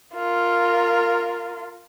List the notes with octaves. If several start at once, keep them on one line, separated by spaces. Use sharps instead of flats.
F4 A#4